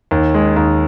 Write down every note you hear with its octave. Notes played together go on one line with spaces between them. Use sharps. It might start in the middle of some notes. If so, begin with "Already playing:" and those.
D#2
G#3
D#2